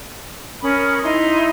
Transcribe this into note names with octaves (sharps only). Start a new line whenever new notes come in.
C#4 A#4 B5 D#6
D#4 E4 C6